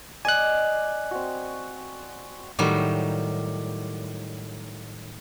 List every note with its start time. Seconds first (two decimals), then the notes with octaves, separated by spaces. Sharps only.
0.25 D5 D#5 G#5 F#6
1.11 C4 F#4
2.59 A2 D#3 F#3 G3